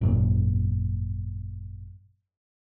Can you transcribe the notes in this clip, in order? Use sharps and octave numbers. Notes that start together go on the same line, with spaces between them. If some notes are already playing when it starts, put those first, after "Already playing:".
G#1 F#2 A#2